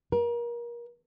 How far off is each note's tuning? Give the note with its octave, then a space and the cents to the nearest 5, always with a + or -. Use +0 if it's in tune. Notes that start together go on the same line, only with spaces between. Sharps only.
A#4 +30